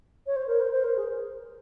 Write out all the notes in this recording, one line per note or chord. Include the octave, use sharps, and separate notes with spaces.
C#5
C5
A#4
C5
C5
A#4
G#4